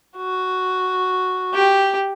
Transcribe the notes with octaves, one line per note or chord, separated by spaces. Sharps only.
F#4
G4